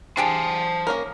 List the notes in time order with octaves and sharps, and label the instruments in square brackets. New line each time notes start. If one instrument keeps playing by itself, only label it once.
[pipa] D4 G4 G#4 [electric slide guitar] C5 A5
[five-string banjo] A#3 C#4 A#4